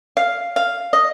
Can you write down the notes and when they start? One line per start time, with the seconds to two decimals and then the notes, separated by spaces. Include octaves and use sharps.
0.17 F5
0.56 F5
0.93 D#5